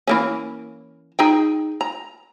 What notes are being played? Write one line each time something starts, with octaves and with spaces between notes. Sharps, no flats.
E3 A#3 C#4
D#4 G#4 G5
A#5